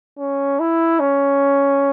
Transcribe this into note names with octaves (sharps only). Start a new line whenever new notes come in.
C#4
E4
C#4